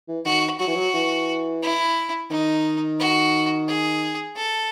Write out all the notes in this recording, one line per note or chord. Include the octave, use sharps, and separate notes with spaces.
E3
D#3 F#4
F#3 F#4
E3
F#3
E3
E4
D#3 D#4
F#4
G#4
A4